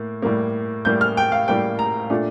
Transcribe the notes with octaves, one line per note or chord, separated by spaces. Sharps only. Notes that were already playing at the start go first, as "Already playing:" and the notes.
Already playing: A2 A#3
A2 G3 A#3
A2 G3 A#3 G6
F6
G5
F5
A2 G3 A#3 G5
A#5
A#2 A3 D4